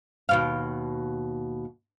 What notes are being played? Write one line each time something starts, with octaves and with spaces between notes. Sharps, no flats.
D#2 B2 F5